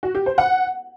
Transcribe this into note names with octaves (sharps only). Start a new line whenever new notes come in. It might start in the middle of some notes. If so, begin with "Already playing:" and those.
F#4
G4
C5
F#5